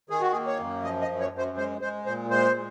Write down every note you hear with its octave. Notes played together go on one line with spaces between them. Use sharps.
D#3 G#4
F#4
A#3 G#4
C#5
F#2
F3 D#5
D#5
F#2
C#5
F#2
C5
G#3 C5
G#3 C5
A#2 C5
G#3 C5
G#3